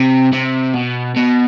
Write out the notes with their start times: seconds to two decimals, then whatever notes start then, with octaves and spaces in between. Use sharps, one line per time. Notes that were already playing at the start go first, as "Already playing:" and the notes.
Already playing: C3
0.33 C3
0.74 B2
1.16 B2